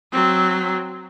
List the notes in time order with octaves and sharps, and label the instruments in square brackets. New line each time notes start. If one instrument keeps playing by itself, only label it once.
[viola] F#3 C4